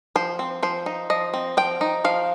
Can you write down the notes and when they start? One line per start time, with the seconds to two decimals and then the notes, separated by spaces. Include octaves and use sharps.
0.16 F3 C5
0.39 C4
0.63 F3 C5
0.86 D#4
1.10 F3 D#5
1.34 C4
1.57 F3 G5
1.81 D#4
2.04 F3 F5